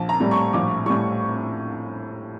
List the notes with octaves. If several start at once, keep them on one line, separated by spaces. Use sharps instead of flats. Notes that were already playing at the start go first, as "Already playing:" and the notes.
Already playing: A#1 A5
A#5
A2 G3
C#6
A#1 D6
A2 G3 C#6